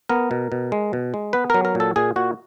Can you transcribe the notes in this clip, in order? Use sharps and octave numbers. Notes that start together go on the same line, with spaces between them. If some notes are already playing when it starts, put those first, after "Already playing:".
B3 A#4
B2
B2
G#3
B2
G#3
B3 B4
F#3 A#4
A#4
A#2
A4
A#2 G#4
A#2 F#4